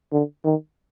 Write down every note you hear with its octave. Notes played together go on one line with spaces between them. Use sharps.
D3
D#3